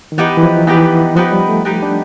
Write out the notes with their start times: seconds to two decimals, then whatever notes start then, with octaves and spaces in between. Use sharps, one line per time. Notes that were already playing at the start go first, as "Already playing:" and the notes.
0.12 D#3
0.18 E3 B3 D#4 G4 B4
0.37 E3
0.43 F3
0.67 E3 B3 D#4 G4 B4
1.16 F3 B3 D#4 G4 B4
1.32 G3
1.49 A3
1.65 B3 D#4 G4 B4
1.83 D4